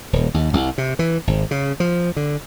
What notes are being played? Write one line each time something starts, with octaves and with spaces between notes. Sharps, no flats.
D#1
D#2
C2
C3
E3
G#1
C#3
F3
D3